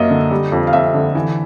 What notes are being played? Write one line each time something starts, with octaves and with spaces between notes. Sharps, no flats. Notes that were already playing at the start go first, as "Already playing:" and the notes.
Already playing: F#2 F#3 A#3 D#5 E5
D3
G3
F2
F5
F2 E5
D3
E3